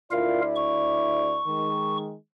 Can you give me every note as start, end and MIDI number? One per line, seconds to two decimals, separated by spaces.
0.11 1.40 38
0.11 1.40 64
0.11 0.41 65
0.11 0.41 70
0.11 1.40 74
0.11 0.41 77
0.56 1.98 85
1.47 2.14 51
1.47 2.14 56